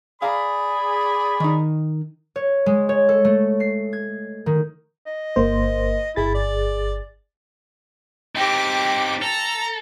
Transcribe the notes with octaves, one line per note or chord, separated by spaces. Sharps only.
G#4 D5 F5 A#5 B5
D#3 D#4
C#5
G#3
C#5
A4
A3
C7
G#6
D#3
D#5
G1 A#3 C5
G1 E4 G#4 A6
D5
C4 D#4 G4 D6
A4 A#5